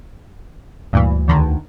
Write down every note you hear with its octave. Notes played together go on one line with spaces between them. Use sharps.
D2 G2 A#2 E3
E2 D3 D#3